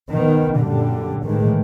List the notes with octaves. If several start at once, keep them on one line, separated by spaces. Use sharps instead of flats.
D#3 B3
F#2 A#2 D3 G3
A2 D#3 E3 G#3